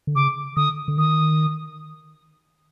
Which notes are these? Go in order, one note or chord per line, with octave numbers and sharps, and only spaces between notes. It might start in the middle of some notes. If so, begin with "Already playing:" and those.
D3
C#3 D6
D3 D#6
D3
D#3 D#6